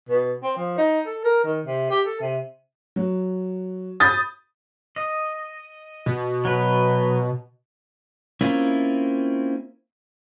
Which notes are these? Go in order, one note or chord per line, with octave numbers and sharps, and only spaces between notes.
B2
C4
F3
D#4
A4
A#4
D#3
C3
G4
A4
C3
F#3
B5 D#6 G6 A6
D#5
B2
F#3 B4
A#3 C4 C#4 E4 F4